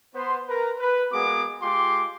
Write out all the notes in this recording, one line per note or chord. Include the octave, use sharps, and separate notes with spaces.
B3 C5 C6
A#4 B4 A#5
B4
G#3 A#3 B3 F#4 G#4 D6
G#3 F4 G4 C6 D6